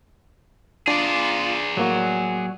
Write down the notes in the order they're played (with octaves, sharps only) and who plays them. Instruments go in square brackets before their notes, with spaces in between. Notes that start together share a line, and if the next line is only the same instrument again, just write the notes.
[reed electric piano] D4 [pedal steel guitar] F4 [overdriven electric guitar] G#4 D5
[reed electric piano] A2 A#3 F#4 [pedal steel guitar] F#3